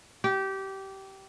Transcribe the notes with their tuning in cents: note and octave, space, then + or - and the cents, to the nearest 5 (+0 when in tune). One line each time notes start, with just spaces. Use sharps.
G4 -20